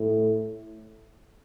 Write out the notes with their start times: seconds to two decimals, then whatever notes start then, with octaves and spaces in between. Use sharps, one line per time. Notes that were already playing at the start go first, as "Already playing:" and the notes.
Already playing: A2